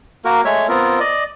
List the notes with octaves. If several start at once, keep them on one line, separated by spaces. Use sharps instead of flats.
A#3 F#4 A#4
G#3 A3 C#5 E5
B3 C4 F4 A#4
D5 D#5